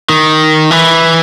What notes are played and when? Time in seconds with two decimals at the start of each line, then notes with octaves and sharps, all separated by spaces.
0.10 D#3
0.71 E3